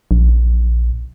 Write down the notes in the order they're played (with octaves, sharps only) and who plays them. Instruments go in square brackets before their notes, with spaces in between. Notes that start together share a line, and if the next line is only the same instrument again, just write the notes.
[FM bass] A#1